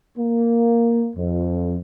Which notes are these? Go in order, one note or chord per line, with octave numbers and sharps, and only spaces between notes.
A#3
F2